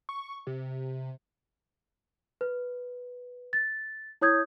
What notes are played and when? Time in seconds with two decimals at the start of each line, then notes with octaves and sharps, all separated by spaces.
0.09 C#6
0.47 C3
2.41 B4
3.53 A6
4.21 E4 C#5 D#6 G6 G#6